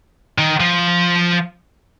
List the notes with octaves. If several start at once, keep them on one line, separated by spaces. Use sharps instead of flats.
D#3
F3